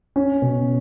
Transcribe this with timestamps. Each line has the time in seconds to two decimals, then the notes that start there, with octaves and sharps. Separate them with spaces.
0.16 C#4
0.42 B2